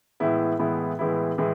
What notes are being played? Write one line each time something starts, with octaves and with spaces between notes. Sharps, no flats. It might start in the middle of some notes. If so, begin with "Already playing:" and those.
A2 E3 G#3 B3 E4
A2 E3 G#3 B3 E4
A2 E3 G#3 B3 E4
A2 E3 G#3